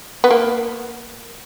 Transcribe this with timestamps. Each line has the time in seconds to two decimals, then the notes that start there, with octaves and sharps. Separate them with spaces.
0.24 B3
0.31 A#3